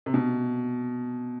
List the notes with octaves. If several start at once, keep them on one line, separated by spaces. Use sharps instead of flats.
C3
B2